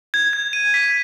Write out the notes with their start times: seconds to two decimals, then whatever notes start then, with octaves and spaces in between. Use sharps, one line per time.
0.14 G#6
0.33 G#6
0.53 D#7
0.74 B6